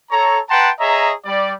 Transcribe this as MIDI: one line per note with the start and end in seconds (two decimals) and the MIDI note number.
0.11 0.39 69
0.11 0.39 73
0.11 0.39 82
0.49 0.70 71
0.49 0.70 78
0.49 0.70 79
0.49 0.70 81
0.49 0.70 82
0.49 0.70 84
0.79 1.12 68
0.79 1.12 73
0.79 1.12 75
0.79 1.12 76
0.79 1.12 82
1.25 1.52 55
1.25 1.52 74